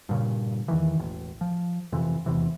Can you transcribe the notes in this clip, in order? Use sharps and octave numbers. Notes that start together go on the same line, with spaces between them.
G2 A#2 C#3
E2 D#3 E3
E1 A1
F3
F2 C3 E3
E1 E2 C3 E3